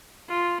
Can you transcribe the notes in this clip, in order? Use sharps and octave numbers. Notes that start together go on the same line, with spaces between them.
F4